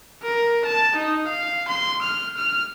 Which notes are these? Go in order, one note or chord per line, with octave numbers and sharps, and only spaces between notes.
A#4
A5
D#4
F5
C6
F6
F6